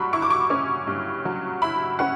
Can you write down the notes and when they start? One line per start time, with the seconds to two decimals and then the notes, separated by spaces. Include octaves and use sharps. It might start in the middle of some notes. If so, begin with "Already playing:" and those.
Already playing: G2 F#3 B5 C#6
0.13 E4 C#6
0.22 D6
0.30 C#6
0.50 C#4
0.87 G2
1.25 F#3
1.62 E4 B5
1.99 C#4 F#5